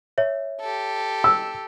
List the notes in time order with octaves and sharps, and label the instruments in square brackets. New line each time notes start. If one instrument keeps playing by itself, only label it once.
[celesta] C#5 E5
[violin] G4 A4
[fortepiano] E6